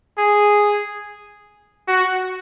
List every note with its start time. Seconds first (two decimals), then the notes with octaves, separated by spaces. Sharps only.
0.18 G#4
1.88 F#4